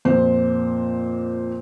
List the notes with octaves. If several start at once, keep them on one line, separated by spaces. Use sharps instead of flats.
F2 A#2 C5